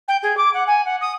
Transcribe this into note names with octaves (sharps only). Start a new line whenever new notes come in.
G5
G#4
D6
F#5
G#5
F#5
D#6